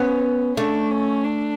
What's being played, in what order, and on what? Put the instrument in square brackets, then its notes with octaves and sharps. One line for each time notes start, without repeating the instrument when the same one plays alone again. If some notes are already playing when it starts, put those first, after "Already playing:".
Already playing: [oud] B3 [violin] C#4
[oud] A3 [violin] D4
[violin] C#4
D4